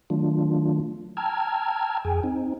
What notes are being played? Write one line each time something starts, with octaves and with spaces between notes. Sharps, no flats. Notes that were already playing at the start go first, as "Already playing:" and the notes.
D#3 F#3 A3 D4 F4
G5 A5 A#5 E6 F6 G#6
F2 G#4 G5 G#5
C4 D#4